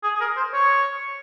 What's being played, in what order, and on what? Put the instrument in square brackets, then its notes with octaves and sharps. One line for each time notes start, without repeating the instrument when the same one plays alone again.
[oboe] G#4
G#4
A#4
C5
C#5